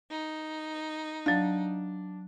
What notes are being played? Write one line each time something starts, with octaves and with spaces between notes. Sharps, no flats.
D#4
F#3 D4 F5